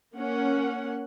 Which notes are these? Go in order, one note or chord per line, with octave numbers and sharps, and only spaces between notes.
A#3 C#4 F#5